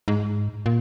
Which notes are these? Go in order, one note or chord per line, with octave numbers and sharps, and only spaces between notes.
G#2
A#2